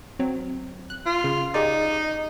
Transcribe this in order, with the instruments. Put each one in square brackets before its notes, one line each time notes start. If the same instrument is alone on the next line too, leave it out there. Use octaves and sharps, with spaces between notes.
[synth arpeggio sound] F#3 C4
F#6
[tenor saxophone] F4
[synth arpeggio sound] C#3
[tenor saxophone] D#4 [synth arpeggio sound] G4 G#4 D5